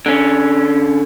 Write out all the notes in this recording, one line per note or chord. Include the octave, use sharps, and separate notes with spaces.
D3 C#4